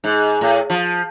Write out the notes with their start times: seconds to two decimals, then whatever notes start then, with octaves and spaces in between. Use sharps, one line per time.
0.04 G#2
0.41 A2
0.70 F3